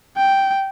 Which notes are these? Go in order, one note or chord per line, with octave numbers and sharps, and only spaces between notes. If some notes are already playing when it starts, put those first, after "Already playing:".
G5